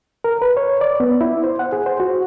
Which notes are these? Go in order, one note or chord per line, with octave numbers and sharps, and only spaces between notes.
A#4
B4
C#5
D5
B3
E4
C5
F#5
G#4
C5
F#4